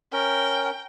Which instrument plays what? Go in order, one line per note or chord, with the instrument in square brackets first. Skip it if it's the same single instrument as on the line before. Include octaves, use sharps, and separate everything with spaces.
[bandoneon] C#4 A#4 [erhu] G5